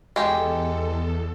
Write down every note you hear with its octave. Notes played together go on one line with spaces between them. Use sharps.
E2 G#3 G4 A4